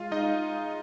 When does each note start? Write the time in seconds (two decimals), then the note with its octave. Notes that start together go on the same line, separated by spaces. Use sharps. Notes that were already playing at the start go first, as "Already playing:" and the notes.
Already playing: G#3 F4 F5
0.12 G#3 D#4 D#5